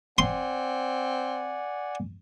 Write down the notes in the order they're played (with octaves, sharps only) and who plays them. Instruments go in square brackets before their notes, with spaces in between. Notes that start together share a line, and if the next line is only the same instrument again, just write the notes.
[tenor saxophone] C4 [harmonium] D5 F#5 G#5 [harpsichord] C6